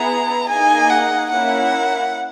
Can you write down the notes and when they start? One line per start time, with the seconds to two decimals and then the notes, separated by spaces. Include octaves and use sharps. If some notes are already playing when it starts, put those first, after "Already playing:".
Already playing: B3 E4 G#4 A#5
0.48 A#3 D#4 G#4 D#5 G#5
0.90 F#5
1.30 A#3 C#4 E4 A#4 E5 F#5